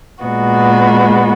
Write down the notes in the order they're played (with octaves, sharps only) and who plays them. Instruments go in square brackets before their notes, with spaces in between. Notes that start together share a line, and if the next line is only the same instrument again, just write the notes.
[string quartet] A#2 G#3 B3 F#4